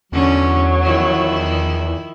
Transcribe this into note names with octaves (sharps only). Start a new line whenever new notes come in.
E2 D3 F#3 C#4
D#3 F3 E4